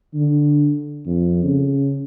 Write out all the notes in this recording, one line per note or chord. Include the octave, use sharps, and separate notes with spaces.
D3
F2
C#3